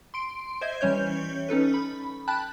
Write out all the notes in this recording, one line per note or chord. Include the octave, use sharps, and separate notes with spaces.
C6 D7
C5 D#5 E5 G#6
E3 G3 C#4 C#5 G6
C#4 D#4 A4 B4
B5
G5 A5 B5 F#6